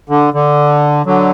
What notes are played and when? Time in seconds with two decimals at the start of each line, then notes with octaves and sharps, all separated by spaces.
0.09 D3
0.34 D3
1.06 D3 F#3